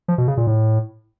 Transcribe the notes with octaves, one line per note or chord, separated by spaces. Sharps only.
F3
B2
C#3
A#2
A2